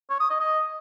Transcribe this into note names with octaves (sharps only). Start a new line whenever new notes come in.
C#5
D#6
D#5
D#5